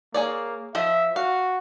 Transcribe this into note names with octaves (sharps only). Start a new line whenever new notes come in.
A#3 G#4 C#5 D5
F3 C5 D#5 E5
F#4 F5